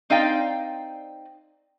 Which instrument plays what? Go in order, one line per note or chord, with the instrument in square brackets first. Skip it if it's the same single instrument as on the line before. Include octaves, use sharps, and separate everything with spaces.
[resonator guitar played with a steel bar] C4 D#4 D5 F5 G5